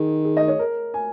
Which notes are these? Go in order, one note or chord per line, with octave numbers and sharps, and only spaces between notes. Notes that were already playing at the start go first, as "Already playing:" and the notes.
Already playing: D#3 G#4
G#4
D#5
C#5
A#4
G#5